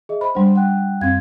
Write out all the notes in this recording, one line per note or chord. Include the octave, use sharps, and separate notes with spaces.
G#4 D#5 E5
C5 B5
G3 D4 C5 F#5 C6
F#5 G5 F#6
F#2 C4 F5 G#6